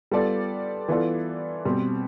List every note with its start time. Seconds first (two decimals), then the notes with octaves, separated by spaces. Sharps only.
0.11 G3 B3 F4 A4 D5
0.88 E3 B3 F4 A4 D5
1.65 B2 G3 C4